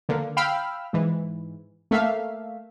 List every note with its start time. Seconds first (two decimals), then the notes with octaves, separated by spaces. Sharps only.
0.09 D3 A#3
0.37 F5 G5 B5 E6 F6
0.93 G#2 E3
1.91 A3 A#3 E5 F5